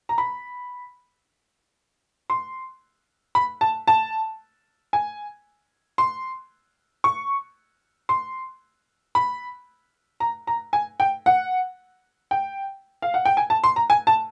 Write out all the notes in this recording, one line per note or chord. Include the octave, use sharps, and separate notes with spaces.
A#5
B5
C6
B5
A5
A5
G#5
C6
C#6
C6
B5
A#5
A#5
G#5
G5
F#5
G5
F5
F#5
G5
G#5
A5
C6
A#5
G#5
A5